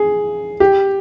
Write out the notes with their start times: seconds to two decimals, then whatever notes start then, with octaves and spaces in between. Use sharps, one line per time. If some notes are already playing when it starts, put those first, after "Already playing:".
Already playing: G#4
0.60 G4